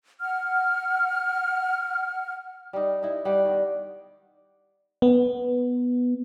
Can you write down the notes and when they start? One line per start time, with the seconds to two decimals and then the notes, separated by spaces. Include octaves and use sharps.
0.21 F#5 F6
2.73 G3 D#4
3.03 D#4 E4
3.25 G3 F#5 G5
3.45 D#3 B3
5.02 B3